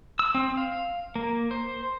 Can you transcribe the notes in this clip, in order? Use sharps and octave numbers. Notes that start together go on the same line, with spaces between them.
E6
C4
F5
A#3
C5